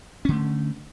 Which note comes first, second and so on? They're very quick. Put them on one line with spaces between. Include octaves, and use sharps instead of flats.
C#4 D3 A3